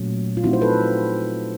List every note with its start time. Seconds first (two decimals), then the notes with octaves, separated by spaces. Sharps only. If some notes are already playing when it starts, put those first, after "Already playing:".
Already playing: A#2 F#3 A3 C#4
0.37 F4
0.43 F3 A3 C4 D#4 E4 F#4
0.53 C5
0.61 A4 B4